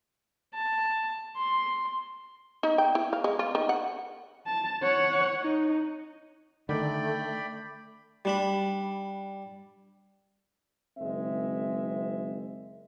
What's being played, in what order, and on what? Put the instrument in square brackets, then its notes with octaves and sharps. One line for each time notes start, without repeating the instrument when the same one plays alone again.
[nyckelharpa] A5
C6
[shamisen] D#4
G5
E4
F5
G#3
F4
D#3
F#5
[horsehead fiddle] A5
C#5 F#5
D#4
[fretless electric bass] D3 D#3 [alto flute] A3 [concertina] D5 G5 B5
[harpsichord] G3 D4 B5
[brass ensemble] F#1 D#3 G#3 C4 E5